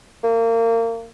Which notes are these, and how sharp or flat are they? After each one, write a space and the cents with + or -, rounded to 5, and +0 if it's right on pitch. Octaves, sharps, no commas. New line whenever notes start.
A#3 -30